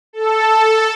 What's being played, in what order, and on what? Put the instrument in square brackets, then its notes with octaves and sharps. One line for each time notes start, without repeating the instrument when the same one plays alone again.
[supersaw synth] A4